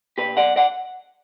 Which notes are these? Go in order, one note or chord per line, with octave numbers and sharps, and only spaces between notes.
A#2 G4 B4
B1 D5 F#5
D5 F#5